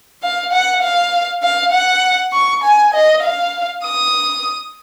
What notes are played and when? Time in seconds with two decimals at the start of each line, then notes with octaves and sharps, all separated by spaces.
0.23 F5
0.52 F#5
0.82 F5
1.43 F5
1.72 F#5
2.32 C#6
2.64 G#5
2.94 D#5
3.23 F5
3.84 D#6